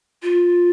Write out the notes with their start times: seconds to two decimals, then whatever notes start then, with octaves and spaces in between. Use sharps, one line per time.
0.23 F4